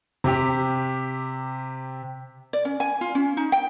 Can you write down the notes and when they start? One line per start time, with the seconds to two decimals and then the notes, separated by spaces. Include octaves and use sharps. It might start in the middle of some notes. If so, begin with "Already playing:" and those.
0.24 C3 G4
2.53 D5
2.65 C#4
2.80 G#5
3.01 F4
3.15 C#4
3.37 D#4
3.52 G5